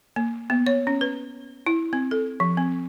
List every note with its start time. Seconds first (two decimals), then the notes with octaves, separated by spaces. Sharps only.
0.16 A#3
0.50 B3
0.67 C#5
0.87 C#4
1.01 B4
1.66 E4
1.93 C4
2.11 A4
2.40 F3
2.57 C4